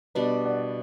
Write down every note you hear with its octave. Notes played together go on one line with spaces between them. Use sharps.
B2 G3 D4 B4 D5
D5 F#5